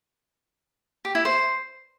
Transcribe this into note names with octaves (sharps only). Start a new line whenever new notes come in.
G4
E4
C5